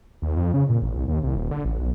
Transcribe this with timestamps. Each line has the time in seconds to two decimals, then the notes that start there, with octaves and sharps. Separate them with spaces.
0.22 D#2
0.36 F2
0.54 C#3
0.69 A#2
0.82 A1
0.96 C2
1.08 D#2
1.23 C2
1.36 D#1
1.51 D3
1.65 A1
1.79 B1